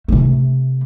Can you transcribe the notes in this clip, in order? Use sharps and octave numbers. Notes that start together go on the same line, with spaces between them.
C3 A3